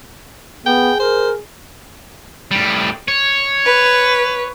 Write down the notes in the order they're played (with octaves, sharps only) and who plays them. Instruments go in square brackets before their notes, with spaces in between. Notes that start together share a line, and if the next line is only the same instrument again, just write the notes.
[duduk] B3 [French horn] G#4 [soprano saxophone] G5
[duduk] A#4 [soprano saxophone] C5
[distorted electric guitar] A2 G3
C#5
[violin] B4